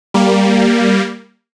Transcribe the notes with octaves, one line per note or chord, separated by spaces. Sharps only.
G3 A#3